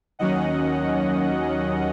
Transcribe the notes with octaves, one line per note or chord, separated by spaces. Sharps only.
D#2 D#3 F#3 C#4 D#5 F#5